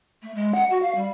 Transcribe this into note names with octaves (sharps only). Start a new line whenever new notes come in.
A3
G#3
F#5
F#4
F5
G3